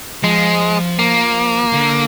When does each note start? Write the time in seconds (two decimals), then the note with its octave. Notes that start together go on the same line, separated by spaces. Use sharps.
0.24 F3 G#3
0.99 A#3
1.74 D3